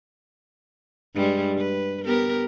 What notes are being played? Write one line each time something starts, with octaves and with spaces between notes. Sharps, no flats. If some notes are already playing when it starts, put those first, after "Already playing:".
G2 G3 G#3
B4
B3 G4 A#4